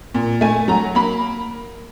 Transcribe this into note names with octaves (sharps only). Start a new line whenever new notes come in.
A#2
A3 G#5
F#3 A#5
A#3 B5